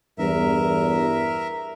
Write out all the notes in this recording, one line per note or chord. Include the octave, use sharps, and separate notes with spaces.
E2 G2 A#4 E5